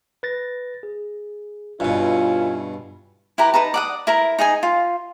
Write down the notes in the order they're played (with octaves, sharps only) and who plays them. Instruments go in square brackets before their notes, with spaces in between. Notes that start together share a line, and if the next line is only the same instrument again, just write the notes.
[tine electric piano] B4 A6 A#6
G#4
[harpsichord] G2 B2 [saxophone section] C#4 E4 [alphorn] F4 [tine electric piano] D#5
[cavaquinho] E4 G4 B4 A#5
D#4 B4 A5 A#5
D5 F#5 D#6
E4 A#4 A#5
D#4 G#4 D#5 G#5
F4